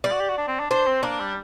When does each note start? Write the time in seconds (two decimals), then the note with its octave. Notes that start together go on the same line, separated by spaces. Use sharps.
0.04 G3 D5
0.12 F#4
0.20 G4
0.29 F#4
0.38 D4
0.48 C4
0.60 D4
0.70 D4 C5
0.87 C4
1.03 A#3 D4
1.20 G3